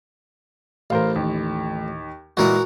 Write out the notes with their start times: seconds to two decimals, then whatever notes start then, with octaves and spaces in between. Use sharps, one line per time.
0.90 A1 A#4 C5 F5
1.16 D#2
2.37 A#2 E3 G#3 F#4 A#4 F#5